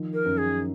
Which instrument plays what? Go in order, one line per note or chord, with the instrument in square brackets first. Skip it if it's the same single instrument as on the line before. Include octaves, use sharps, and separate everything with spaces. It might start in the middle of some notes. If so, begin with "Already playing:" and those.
Already playing: [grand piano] D#3 F3
[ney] A#4
[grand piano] F#2
[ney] G#4